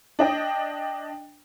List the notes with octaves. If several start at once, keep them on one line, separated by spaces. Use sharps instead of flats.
D4 D#5 G5